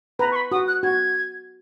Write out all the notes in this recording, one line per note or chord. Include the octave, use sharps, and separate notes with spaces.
B4 A#5
C#6
B5
F#4 D#6
F#6
F#4 G#6